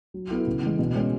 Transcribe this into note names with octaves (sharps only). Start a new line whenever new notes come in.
F#3
B3 E4 A4
C#3
E3 G#3
B2
G#3 C#4